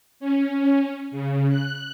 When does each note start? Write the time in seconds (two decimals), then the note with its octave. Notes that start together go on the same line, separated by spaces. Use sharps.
0.20 C#4
1.11 C#3
1.50 F#6